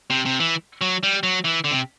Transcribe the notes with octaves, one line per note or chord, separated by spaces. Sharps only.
C3
C3
E3
F#3
G3
F#3
E3
D3
C3